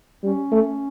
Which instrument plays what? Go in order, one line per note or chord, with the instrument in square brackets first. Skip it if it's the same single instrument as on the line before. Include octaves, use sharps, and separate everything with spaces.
[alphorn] G3 [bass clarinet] C#4
[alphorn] A3